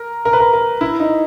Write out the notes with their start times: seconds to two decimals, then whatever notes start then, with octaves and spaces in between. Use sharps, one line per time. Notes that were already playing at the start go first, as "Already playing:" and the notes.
Already playing: A#4
0.25 A#4
0.33 B4
0.40 A#4
0.53 A#4
0.81 E4
1.00 D#4